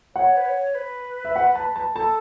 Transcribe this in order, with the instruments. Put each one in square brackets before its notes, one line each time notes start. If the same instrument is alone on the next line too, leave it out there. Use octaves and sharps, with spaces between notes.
[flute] C#5 [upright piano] F#5
[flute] B4
C#5
B4
[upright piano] E5
F#5
A5
A5
[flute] A4 [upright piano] A5